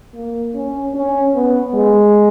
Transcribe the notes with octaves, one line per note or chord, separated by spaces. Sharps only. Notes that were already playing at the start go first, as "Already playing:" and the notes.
A#3
C#4
C#4
B3
G#3